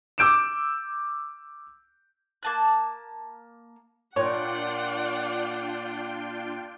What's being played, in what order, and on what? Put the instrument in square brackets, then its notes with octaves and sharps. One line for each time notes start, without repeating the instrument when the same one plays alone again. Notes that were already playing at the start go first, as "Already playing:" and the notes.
[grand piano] D6 E6 G6 D7 E7
[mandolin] A#3 A5 F#6
[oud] A#2 [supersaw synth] D4 F4 G5 [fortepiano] C#5 [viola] D5 F#5